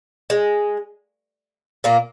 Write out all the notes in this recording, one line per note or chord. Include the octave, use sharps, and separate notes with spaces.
G#3
A#2 A#3